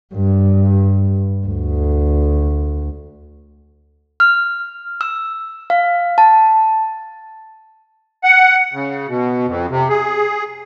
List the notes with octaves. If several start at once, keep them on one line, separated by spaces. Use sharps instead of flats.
G2
D2
F6
E6
F5
A5
F#5
C#3
B2
F2
C3
G#4